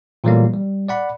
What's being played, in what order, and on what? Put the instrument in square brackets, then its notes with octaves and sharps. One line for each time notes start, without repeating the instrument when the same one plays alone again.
[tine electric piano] A#2 E3 F#3 G3 A3 A#3
G3
D5 F#5 B5